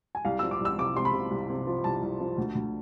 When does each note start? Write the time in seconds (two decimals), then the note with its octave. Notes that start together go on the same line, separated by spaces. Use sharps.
0.15 G#5
0.25 C2 F5
0.39 F3 E6
0.51 D6
0.60 C2 E6
0.78 C3 D6
0.96 C3 C6
1.05 B5
1.13 C3
1.31 C2
1.49 C3
1.67 F3
1.84 C2 A5
2.02 C2
2.20 F3
2.38 D2
2.55 D2